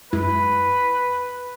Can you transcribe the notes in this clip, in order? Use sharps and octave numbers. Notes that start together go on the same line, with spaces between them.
F#2 G#3 E4 B4